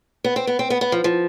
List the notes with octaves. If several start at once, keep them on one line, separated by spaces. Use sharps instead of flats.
B3
C4
B3
C4
B3
B3
F3
F3